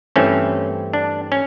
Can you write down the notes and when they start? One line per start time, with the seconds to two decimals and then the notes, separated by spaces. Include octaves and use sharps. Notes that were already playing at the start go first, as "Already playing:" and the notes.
0.16 G2 E3 A3 C4 C#4
0.94 D4
1.32 C#4